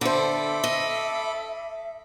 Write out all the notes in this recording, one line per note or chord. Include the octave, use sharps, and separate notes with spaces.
D3 A4 C5 E5 B5 D6
D#5